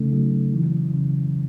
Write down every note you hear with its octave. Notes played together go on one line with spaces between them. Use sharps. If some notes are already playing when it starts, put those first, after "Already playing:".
Already playing: C#3 A3 D#4
F#3
E3
C#3